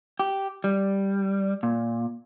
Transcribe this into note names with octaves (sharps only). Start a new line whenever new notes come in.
G4
G3
A#2